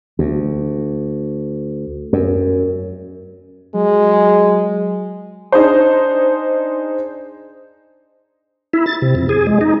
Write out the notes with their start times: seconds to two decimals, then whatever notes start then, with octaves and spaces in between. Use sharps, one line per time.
0.19 D2
2.13 F#2
3.75 F#3 G#3
5.52 D4 D#4 G#4 C5
8.73 E4
8.86 A6
9.02 C3
9.15 F2
9.29 G#4
9.47 G#3
9.61 D#4